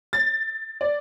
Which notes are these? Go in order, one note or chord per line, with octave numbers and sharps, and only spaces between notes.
A6
D5